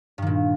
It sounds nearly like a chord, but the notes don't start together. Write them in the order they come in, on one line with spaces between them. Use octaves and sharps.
G2 D#3 A#2